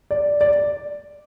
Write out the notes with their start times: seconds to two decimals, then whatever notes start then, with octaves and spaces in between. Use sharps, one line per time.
0.11 D5
0.41 D5